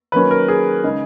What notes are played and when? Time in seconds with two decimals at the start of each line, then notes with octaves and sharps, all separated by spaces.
0.12 D#3 F#3 A#3 C#4 B4
0.31 A#4
0.48 G#4
0.84 C#3 G#3 D#4